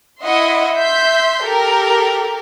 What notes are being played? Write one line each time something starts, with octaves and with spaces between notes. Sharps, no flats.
E4 D#5 E5 F#5 C6
E5 C6 G6 B6
G4 A4 A#4